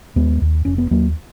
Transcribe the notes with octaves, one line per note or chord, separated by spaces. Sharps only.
D#2 G#3 B3
D#2
F1 C#4
B3
D#2 F#3 A#3